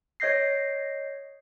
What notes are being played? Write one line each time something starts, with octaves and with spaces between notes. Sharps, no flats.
C#5 D#5 G6 A#6 C7